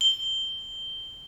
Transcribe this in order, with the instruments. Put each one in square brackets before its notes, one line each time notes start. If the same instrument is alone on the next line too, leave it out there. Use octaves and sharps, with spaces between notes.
[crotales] G7